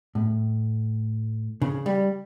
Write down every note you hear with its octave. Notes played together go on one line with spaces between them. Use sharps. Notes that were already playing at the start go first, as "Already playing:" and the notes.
A2
C#3
G3